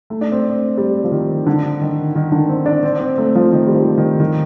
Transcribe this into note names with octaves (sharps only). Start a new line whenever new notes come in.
A3
D4
C4
G3
F3
D#3
D3
D#3
D#3
D3
C4
D4
C4
C4
A3
F3
D#3
G3
F3
D#3
D#3